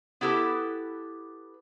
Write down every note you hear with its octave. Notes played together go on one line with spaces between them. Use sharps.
B3 E4 G4 A4 B4